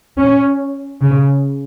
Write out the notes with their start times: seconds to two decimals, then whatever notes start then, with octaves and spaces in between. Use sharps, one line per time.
0.18 C#4
1.02 C#3